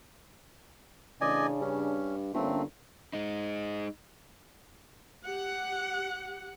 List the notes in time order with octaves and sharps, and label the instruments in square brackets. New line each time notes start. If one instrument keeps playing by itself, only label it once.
[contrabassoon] A1 [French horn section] C#3 D4 [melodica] D5 D#5 G#5
[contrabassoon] G2 [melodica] C#4
[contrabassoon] G1 [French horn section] D3 A#3 C#4 [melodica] A3 C4
[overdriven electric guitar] G#3 D#4
[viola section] G4 F#5